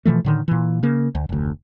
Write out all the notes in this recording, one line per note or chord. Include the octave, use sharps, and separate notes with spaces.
B2 E3 F3 A3
A2 D3 D#3
A#2 E3
C#3 A#3
D2
F1 D2